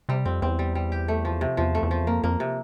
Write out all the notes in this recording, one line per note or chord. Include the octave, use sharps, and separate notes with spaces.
C3 G3
F2 C4
E2 C4
G3
G3
G4
A3
F3
C3
E2 F3
A3
E2
F3
F2 A#3
F2 A#3
C3